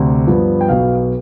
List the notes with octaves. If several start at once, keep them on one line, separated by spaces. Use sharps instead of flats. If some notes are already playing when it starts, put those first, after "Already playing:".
Already playing: D2 C3
G2 F3 B3
G5
B1 B2 B3 F5